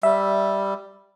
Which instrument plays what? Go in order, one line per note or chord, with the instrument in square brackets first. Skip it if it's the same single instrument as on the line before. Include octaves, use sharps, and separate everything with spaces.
[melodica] G3 [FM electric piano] E5